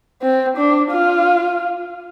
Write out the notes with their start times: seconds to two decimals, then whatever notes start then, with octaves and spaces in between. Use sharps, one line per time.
0.22 C4
0.57 D4
0.91 F4